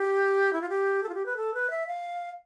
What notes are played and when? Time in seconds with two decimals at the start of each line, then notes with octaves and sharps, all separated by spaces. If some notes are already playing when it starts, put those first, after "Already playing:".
Already playing: G4
0.53 E4
0.62 F4
0.69 G4
1.03 A4
1.09 F4
1.14 G4
1.26 B4
1.37 A4
1.54 B4
1.70 E5
1.87 F5